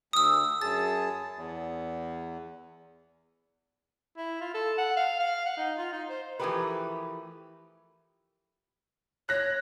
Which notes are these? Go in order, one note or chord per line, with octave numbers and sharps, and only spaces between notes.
D2 D#6 E6
F#2 G#4 A5 A6
E2
E4
F4
A4
F#5
F5
F5
F#5
D#4
F4
D#4
C5
E3 F3 A3 G4 A#4 B4
C#5 F#6 A#6